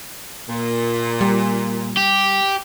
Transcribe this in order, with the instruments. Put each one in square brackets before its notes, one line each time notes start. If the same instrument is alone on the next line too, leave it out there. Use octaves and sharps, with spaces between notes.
[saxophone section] A#2
[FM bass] G3
[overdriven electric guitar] G4